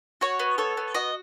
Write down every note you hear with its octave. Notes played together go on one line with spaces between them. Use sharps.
F#4 C#5
B3
A4 C#5
B3
F#4 D#5